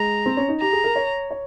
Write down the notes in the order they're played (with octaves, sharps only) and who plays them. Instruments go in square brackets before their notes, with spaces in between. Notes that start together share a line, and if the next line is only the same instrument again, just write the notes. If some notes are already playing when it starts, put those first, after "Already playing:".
Already playing: [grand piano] G#3 [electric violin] A#5
[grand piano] C4
C#4
D#4
[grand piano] G4 [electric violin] A#5
[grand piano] G#4
A#4
C#5
C#5